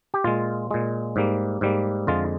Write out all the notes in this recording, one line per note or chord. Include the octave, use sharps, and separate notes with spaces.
G4
A#2 G#3 F4
A#2 G#3
G#2 G3 A#3
G#2 G3 A#3
F2 D3 G#3 F4